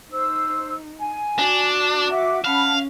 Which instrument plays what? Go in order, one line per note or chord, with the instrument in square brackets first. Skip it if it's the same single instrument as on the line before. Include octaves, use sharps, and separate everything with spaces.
[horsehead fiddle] D#4 [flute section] C5 E6
[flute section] G#5
[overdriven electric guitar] D4 [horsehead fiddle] F#4
[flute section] E5 F#5 D6
[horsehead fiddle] C#4 [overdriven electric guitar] F5 [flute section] F#5 A5 B5